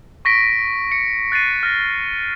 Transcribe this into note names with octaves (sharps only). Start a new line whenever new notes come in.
C#6 A#6 B6 D7
C#7
F#6 A6 C7 D#7
F6 A#6